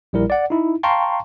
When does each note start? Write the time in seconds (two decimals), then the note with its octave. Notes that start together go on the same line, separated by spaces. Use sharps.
0.13 A#1 G3 E4 A#4
0.30 D5 F#5
0.50 D#4 E4
0.83 F5 G5 A5 A#5 C6 C#6